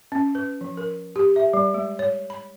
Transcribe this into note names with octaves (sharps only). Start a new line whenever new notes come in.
C#4
B4
F3
A#4
G4
E5
G3
G#3
C#5
B5